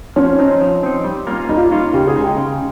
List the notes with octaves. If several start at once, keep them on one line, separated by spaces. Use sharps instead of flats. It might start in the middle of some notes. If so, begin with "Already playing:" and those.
F3 C#4
C4 D#4
F3
C4 D#4
G3
A#3 C#4 F4
G3 D#4
F4
D#4
A#3 C#4 F4
C#3 G4
G#4
G#3 D#4
G5
C#3